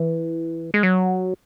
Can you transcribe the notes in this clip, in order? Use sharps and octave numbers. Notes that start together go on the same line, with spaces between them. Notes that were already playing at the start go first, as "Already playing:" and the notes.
Already playing: E3
G#3
F#3